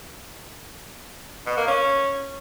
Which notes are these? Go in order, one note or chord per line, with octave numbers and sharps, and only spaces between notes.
B2
A#3
C#4